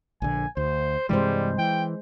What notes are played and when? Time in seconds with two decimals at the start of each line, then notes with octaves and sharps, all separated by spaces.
0.22 A#1 D3 G#5
0.57 D2 C5
1.09 G2 C3 E3 G3 G#3 C5
1.58 E3 G5